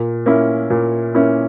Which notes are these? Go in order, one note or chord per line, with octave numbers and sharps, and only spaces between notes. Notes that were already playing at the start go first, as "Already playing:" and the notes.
Already playing: A#2
A#3 C#4 E4
A#2
A#3 C#4 E4